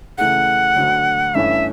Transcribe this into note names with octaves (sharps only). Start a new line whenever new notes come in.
C#3 E3 A3 F#5
D2 D3 F#3
G2 E3 A3 C#4 E5